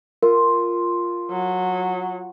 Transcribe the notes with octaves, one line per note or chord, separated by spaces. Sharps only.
F4 A#4
F#3